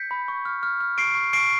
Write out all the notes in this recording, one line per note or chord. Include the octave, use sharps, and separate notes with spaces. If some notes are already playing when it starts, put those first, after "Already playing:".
Already playing: G6 B6 C#7
B5
C#6
F6
F6
F6
C#6 C7 D7
C#6
C#6 C7 D7